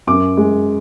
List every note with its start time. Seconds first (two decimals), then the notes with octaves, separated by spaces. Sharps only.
0.07 F#2 D6
0.37 G#3